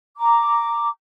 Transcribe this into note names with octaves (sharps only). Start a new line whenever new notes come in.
A#5 D6